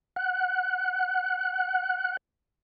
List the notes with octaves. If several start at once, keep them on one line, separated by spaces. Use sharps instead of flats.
F#5 F#6